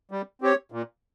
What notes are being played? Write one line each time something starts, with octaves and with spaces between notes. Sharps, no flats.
G3
C4 G4 C#5
A#2